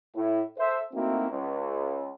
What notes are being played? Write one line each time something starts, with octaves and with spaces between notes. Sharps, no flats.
A2 E4
A4 C5 E5
A3 A#3 C4 D#4 E4 F#4
C#2